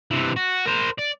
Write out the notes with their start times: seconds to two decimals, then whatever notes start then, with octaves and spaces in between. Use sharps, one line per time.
0.11 C3 E3
0.36 F#4
0.66 A#4 C5
0.98 D5